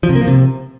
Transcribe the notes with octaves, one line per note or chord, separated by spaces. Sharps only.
F3
C3
A#3
F3
C3